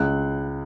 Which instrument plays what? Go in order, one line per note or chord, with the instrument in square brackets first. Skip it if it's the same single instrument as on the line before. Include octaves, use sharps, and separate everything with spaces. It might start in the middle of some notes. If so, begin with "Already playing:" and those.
Already playing: [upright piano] C#2 F#6